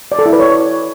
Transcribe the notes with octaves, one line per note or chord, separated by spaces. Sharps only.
D5
A4
E4
B4
C#5